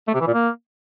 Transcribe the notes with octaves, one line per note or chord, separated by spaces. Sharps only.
A3
C3
E3
A#2
A#3